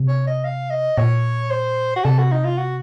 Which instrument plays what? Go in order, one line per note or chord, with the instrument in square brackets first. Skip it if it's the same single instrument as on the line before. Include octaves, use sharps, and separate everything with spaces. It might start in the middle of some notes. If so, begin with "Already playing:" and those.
Already playing: [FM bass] C3
[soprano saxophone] C#5
D#5
F5
D#5
[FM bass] A#2 [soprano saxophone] C#5
[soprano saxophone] C5
F#4
[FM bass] C3 [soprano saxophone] A4
[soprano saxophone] F#4
D#4
F4
F#4